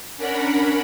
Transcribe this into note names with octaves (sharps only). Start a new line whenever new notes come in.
C#4 D4 A#4 F#5 B5